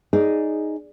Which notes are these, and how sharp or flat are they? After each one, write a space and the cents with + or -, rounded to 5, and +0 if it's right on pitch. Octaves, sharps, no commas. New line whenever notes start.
D#4 +0 G#4 +0 D5 +0